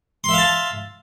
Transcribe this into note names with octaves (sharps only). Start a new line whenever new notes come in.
E5 F5 A5 C6